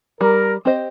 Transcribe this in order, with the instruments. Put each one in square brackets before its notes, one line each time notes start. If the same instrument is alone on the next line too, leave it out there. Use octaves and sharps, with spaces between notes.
[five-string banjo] G3 [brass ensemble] A#4
[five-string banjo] C4 G4 C5 D#5